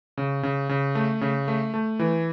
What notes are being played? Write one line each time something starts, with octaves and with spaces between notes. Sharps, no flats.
C#3
C#3
C#3
A3
C#3
A3
A3
E3